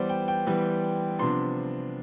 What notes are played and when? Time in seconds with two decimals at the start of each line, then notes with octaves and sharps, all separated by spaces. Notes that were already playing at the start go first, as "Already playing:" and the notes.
Already playing: E3 G3 B3 C5 D5
0.09 G5
0.28 G5
0.46 E3 G3 B3
1.19 C3 F3 B3 D4 C6